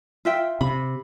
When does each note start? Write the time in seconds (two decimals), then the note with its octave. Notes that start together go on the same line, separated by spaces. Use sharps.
0.25 F4 E5 G5
0.61 C3 B5